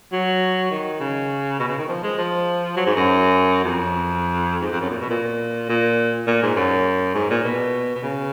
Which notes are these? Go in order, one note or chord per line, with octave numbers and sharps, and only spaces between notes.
F#3
D#3
C#3
B2
C#3
D#3
F3
G#3
F3
F#3
G#2
F#2
F2
G#2
F2
F#2
A#2
B2
A#2
A#2
A#2
G#2
F#2
G#2
A#2
B2
B2
C#3